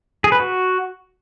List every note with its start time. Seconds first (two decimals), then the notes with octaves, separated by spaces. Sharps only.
0.24 G#4
0.32 B4
0.40 F#4